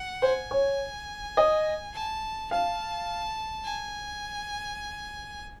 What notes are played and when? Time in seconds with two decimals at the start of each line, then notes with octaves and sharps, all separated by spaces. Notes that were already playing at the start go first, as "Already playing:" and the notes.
Already playing: F#5
0.22 C5 G#5
0.51 C#5
1.37 D#5
1.93 A5
2.51 F5 A5
3.64 G#5